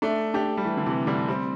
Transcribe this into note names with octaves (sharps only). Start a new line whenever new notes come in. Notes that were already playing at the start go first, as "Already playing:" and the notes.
A3 D4
D4 G4
G3
E3 A3
D3
C3 E3
D3 G3
G3 C4